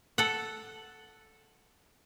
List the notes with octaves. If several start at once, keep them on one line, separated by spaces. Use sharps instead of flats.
A4 F#5